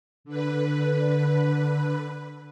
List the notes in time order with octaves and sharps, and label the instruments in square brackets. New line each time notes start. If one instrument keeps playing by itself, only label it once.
[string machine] D3 B4